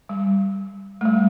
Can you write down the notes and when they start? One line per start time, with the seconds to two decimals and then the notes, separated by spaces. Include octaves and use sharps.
0.09 G3
1.01 A3
1.05 G3